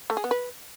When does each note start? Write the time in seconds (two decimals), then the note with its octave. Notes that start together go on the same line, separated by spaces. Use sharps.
0.10 A3
0.17 G#4
0.24 B3
0.31 B4